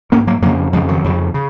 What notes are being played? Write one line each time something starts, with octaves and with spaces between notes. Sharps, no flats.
G#2 A#3 C#4
F#3 A#3
F2 C#3 F#3 A#3
F2 C#3 F3 G#3
D#3 F#3
F2 C#3
C#3